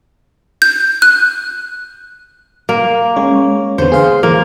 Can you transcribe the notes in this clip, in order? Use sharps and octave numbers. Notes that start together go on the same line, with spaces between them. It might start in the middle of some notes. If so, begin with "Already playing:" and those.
G6
F#6
A#3
G#3 C#4 C#5
E2 D3 B3 C5
G#4 F5 C6
E3 A#3